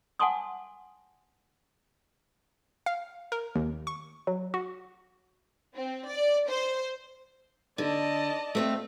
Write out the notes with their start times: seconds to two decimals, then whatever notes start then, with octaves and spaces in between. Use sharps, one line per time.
0.19 F#5 G#5 A5 C6 D6 D#6
2.86 F5
3.32 A#4
3.55 D#2
3.87 C#6
4.27 F#3
4.54 F#4
5.75 C4
6.07 D5
6.48 C5
7.78 D3 D5 D#5 A5
8.55 A3 C4 F4